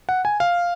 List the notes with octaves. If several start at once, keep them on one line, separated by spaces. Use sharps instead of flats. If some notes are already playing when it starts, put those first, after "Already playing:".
F#5
G#5
F5